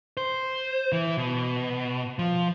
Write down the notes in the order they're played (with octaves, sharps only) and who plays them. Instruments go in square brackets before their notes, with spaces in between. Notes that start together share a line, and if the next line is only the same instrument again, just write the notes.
[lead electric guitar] C5
E3
B2
F3